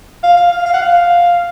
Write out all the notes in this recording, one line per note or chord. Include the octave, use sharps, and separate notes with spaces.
F5
F5
F5
F5
F#5
F5